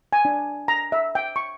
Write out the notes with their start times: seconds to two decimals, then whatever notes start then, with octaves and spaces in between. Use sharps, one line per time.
0.13 G#5
0.25 D4
0.68 A#5
0.92 E5
1.15 G5
1.36 C#6